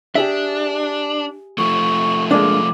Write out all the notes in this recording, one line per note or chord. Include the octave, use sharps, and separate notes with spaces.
D4 G4 G#4 E5
F3 A3 C#6
G#3 A#3 D4 D6